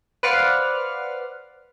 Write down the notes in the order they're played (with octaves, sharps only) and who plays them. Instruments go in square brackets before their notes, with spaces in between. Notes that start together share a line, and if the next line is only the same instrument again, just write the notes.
[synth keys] B4 C5 D5 F5 F#5 F6